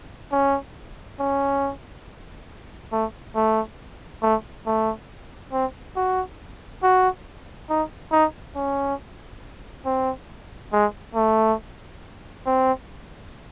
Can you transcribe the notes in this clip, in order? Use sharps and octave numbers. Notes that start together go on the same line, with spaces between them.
C#4
C#4
A3
A3
A3
A3
C4
F#4
F#4
D#4
D#4
C#4
C4
G#3
A3
C4